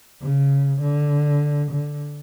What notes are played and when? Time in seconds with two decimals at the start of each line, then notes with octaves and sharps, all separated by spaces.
0.22 C#3
0.81 D3
1.71 D3